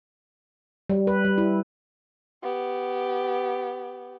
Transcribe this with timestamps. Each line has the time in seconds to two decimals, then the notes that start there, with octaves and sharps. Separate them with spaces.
0.90 G3
1.07 B4
1.25 G3
1.38 E4
2.42 B3 G4